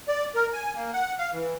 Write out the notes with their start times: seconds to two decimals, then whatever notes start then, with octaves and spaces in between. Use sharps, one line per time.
0.08 D5
0.35 A#4
0.53 G#5
0.76 A#3
0.94 F#5
1.19 F5
1.33 E3